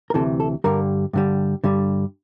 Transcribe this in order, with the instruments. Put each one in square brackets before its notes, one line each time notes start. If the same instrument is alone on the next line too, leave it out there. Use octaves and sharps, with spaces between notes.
[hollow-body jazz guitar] A#4
D2 C3 E3 A4
A4
G2 D3 G3 A#4
G2 D3 G3
G2 D3 G3